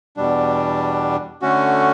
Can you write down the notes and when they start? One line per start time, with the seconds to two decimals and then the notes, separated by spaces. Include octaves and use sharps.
0.17 E2 B2 G3 D4
1.42 D3 A3 C#4 F#4